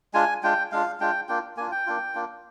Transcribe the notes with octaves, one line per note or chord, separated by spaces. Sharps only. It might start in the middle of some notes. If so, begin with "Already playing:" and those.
G#3 D4 F4 G#5
G#3 D4 F4 G5
G#3 D4 F4 F5
G#3 D4 F4 G5
A#3 D4 F4 G5
A#3 D4 F4 G#5
G5
A#3 D4 F4
A#3 D4 F4